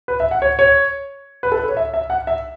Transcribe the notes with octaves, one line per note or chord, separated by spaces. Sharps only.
B4
E5
F#5
C#5
C#5
B4
A4
B4
C#5
E5
E5
F#5
E5